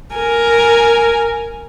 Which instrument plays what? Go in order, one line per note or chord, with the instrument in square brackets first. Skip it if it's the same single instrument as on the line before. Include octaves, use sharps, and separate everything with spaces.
[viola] A#4 G#5